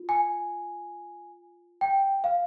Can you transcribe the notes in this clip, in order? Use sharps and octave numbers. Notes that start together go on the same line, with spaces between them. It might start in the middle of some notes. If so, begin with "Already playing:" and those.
Already playing: F4
G#5
G5
F5